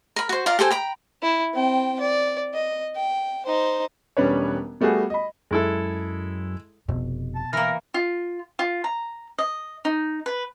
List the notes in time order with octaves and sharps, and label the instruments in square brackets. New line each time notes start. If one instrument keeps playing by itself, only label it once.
[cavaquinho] A#4 B5
F#4 C5
F4 A#4 D5 F5
G4 A4 C5 G#5
G5 A#5 B5
[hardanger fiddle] E4
C4 G5
D5
D#5
G5
D#4 C5
[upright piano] E1 G3 C#4 D4 B4 C#5
G3 A3 B3 F#4 G#4
D#5 B5
[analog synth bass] F#2 [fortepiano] G#3 E4 A4
[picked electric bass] F1 [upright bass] B2
[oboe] A5
[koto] E3 A#3 [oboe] A#4
[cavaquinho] F4
F4
A#5
D#5
D#4
B4